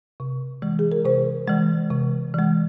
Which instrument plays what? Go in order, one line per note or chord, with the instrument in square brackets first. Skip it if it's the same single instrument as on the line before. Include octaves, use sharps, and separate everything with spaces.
[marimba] C3
E3 G#3
G#4
A#4
C3 C5
E3 G#3
C3
E3 G#3